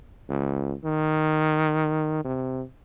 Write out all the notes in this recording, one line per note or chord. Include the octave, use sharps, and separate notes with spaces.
C#2
D#3
C3